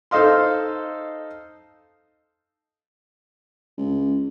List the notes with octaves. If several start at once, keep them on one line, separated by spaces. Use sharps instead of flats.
D#4 A4 C5 D#5 F5 C6
C#2